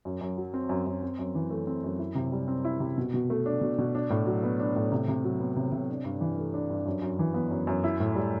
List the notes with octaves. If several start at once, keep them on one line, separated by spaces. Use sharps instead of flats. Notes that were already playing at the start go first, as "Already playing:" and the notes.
F#2
F#2
F#3
C4
F#2
F#2
C4
F#2
E3
A3
C4
F#2
E4
C3
G3
C4
E4
C3
B2
B2
A3
D4
B2
B2
D4
A2
F#3
B3
D4
A2
C3
C3
F#3
B3
C3
C3
D4
G2
E3
A3
D4
G2
F#2
F#2
E3
B3
F#2
F#2
E4
A2
G3